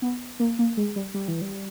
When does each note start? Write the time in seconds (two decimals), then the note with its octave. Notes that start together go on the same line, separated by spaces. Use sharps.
0.02 B3
0.40 A#3
0.59 A#3
0.77 G#3
0.96 G3
1.14 G3
1.28 E3
1.42 G3